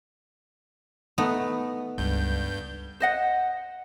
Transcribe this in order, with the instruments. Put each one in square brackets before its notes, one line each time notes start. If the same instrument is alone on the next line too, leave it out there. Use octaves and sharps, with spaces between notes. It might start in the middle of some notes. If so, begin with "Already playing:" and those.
[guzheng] A3 B3 D#4
[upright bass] C#2 [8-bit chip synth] G2 G6
[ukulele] C5 D#5 F#5